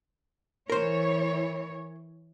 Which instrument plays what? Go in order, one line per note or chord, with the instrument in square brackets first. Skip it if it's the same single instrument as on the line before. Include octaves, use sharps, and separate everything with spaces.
[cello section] E3 C#5 [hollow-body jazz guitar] A#4 C5